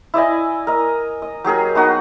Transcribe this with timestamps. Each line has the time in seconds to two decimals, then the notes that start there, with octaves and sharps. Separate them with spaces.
0.14 E4 D5 D#5 G#5
0.67 A#4 D#5
1.22 D#5
1.44 F#3 G4 G#4 A#4
1.75 B3 D#4 F#4 A#4